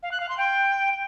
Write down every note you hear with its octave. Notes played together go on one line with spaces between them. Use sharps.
F5
F#6
F5
C6
G5